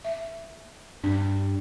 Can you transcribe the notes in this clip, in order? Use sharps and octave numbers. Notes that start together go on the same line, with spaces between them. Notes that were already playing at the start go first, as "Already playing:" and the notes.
E5
G2 D4